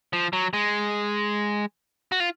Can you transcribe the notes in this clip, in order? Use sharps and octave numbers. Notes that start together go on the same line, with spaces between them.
F3
F#3
G#3
F#4
F4